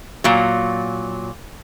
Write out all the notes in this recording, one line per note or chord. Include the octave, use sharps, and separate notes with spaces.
A#2 F#3